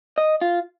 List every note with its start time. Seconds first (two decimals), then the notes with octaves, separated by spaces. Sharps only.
0.18 D#5
0.41 F4